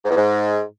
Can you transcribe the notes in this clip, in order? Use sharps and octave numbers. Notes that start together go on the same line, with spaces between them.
G#2
E2
G#2